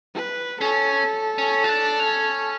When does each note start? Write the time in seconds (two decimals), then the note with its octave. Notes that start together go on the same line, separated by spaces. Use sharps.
0.14 B4
0.60 C#4 A4
1.38 C#4
1.64 F4
1.69 D4
2.00 C#4